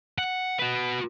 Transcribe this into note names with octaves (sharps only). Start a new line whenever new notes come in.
F#5
F#4 B4